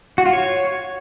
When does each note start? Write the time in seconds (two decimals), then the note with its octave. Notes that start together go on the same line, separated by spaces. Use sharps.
0.18 F#4
0.26 F4
0.33 C#5